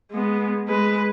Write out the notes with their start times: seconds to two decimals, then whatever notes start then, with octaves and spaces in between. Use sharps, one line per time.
0.11 G#3 B3
0.67 G#3 B4